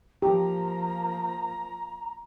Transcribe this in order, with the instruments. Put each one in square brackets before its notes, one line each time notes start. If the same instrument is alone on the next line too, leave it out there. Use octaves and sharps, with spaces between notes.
[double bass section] F3 A#3 [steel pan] G4 [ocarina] A#5